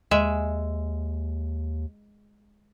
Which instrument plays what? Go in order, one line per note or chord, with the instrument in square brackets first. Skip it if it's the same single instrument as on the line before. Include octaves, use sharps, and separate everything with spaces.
[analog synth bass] D#2 [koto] G#3 E5